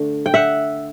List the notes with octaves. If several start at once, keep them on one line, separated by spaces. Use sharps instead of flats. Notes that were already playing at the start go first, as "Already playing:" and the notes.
Already playing: D3 A3
G5
E5 F#5